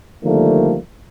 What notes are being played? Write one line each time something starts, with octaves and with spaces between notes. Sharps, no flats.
D3 D#3 F3 G3 A3 A#3